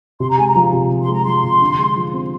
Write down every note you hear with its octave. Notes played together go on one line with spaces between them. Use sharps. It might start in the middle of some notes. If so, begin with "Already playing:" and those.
C3 C6
A#5
G#3 G#5
A#5
F3
C3
C3
C6
G#3 A#5
F3 C6
C3
D3
G#3
F3
C4